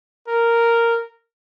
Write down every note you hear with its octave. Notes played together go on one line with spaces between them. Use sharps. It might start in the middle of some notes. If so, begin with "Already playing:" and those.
A#4